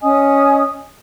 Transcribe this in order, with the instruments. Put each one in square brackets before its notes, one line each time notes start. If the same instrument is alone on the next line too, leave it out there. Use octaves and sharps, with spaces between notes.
[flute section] C#4 D#5 G#5 D#6